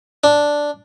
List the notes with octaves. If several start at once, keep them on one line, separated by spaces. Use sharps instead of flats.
D4